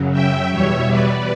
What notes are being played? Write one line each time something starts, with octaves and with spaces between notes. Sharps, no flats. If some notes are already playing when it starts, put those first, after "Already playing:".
Already playing: F#2 C#3 F#3
E5 G5
E2 B2 G3 C#5 E5
B4 D5